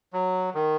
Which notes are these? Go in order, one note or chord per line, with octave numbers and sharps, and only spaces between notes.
F#3
D#3